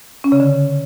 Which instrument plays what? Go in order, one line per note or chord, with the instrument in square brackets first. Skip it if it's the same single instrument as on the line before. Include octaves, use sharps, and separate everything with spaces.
[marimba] C#4
C#3
D3